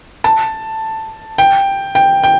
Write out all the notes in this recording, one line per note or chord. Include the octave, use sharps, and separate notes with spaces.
A5
G5
G5
G5